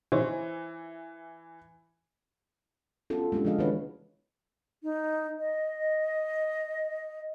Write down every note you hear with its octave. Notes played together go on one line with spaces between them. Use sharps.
E3 D#4 C5 C#5
B3 C#4 F4 F#4 A4
G#3 A#3 C#4 D4 G4
C#3 E3 F3 F#4 D#5 F5
D#3 E3 A#3 D4 B4 C#5
D#4
D#5